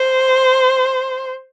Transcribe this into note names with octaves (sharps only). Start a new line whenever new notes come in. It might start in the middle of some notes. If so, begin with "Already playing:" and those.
Already playing: C5